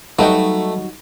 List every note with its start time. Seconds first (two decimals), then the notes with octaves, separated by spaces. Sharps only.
0.19 F#3 G3 A3 D#4 F#4 B4 D#5 G5